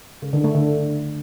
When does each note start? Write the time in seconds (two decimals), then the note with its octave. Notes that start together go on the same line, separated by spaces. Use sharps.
0.22 C#3
0.33 D3
0.44 A3
0.55 D3